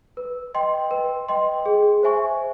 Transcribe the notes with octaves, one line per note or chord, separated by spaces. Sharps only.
B4
D#5 G5 C6
B4
D#5 G5 C6
G#4
C5 E5 G#5 C#6